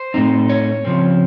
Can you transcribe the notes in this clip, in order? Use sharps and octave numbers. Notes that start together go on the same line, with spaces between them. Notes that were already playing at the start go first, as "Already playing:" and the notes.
Already playing: C5
A2 A3 C4 D#4
C#5
C#3 F3 C4